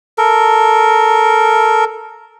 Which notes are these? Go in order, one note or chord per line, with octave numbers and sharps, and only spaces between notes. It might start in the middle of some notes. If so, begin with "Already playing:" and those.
A4 A#4